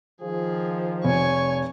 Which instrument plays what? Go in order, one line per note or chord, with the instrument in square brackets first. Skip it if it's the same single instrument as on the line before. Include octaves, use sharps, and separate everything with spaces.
[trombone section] D#3 F3 [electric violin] G#4
[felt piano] F1 [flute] C#5 [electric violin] G#5 C#6